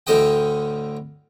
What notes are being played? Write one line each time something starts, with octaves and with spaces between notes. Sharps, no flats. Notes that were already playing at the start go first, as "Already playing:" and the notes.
D2 A2 D3 C5 D#5 G5